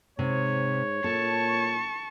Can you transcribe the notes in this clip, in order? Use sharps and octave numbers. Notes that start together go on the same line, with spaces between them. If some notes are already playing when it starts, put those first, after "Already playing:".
G#2 C3 C#5
A#2 A4 A5 C#6